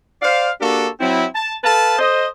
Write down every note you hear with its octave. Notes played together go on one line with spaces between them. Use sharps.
C5 D5 F5
A#3 D4 F#4 G4 A4
F#3 C4 E4
A5
A4 B4 F5 A5
A4 C5 D#5